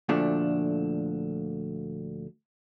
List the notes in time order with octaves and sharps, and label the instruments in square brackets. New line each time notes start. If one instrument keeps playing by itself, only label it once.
[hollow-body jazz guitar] D2 A#2 D3 F3 A3 D4